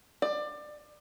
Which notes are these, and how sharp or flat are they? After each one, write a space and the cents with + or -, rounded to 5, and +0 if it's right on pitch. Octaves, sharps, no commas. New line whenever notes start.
D5 +25